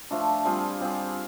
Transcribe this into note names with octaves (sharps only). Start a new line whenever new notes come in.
F3 A3 D4 F4
G3 C4 F4 G#4
G3 C4 F4 G#4